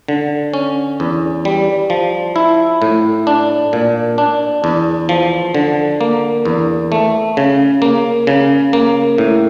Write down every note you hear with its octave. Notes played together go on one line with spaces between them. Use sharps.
D3
C#4
E2
G3
F3
E4
A2
D4
A#2
D4
E2
F3
D3
A#3
E2
A3
C#3
A#3
C#3
A#3
A2